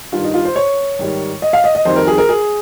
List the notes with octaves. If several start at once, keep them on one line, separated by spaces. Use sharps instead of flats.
G2 D#3 G3 F4
D#4
F4
C5
C#5
G#2 D#3 G3
D#5
F5
D#5
D#5
F2 D#3 G3 C5
A#4
G#4
A#4
G#4